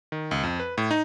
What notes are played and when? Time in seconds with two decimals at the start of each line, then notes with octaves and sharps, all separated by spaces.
0.12 D#3
0.31 C#2
0.43 F2
0.60 B4
0.78 A2
0.91 D#4